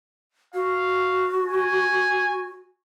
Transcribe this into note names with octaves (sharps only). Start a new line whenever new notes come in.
F#4 F5
G#5